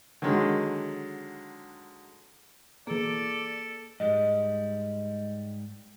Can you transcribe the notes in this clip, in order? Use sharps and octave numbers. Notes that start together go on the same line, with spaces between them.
D3 D#3 F#3 G#3
B2 E3 A#3 G#4 A4 D5
G#2 G3 G#3 D#5